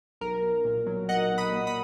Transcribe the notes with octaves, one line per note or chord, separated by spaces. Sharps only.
B1 A#4
B1
A#2
F#3
B1 D#5 F#5
B1
B5 D#6
A#2
B5 D#6